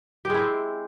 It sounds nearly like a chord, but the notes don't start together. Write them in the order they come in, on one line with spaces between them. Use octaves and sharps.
G4 G#3 E4 C4